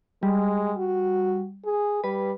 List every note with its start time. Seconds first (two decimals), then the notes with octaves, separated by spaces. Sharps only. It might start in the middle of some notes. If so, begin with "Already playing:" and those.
0.23 G3 G#3
0.77 F#4
1.65 G#4
2.04 G3 B4